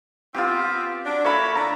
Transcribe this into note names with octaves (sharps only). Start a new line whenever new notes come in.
B3 C4 F4 G4
F#3 D4
A#3 E4 A4 C#5 B5
D3 A3 D4 A#5